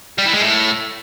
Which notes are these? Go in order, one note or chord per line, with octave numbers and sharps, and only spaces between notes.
G3
E3
G#3
A2